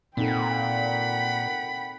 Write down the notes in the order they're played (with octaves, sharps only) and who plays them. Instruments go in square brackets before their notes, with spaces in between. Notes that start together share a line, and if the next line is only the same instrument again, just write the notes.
[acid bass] A#2 [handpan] C4 D#4 A4 [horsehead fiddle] F#5 G5 [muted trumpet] B5